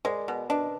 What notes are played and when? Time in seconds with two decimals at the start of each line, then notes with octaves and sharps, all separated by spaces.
0.05 G#3 A#4 D5
0.28 B2
0.49 D4 B4 D#5